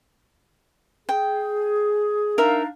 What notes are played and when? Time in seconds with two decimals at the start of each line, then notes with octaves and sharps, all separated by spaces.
1.09 G#4 G5
2.38 D4 D#4 A#4 E5 F5